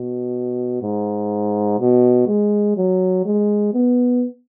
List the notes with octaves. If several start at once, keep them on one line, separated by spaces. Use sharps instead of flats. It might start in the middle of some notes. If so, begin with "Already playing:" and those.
Already playing: B2
G#2
B2
G#3
F#3
G#3
B3